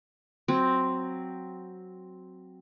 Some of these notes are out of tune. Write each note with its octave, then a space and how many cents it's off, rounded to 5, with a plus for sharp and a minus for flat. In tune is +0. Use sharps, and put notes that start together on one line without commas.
F#3 +0 C4 +0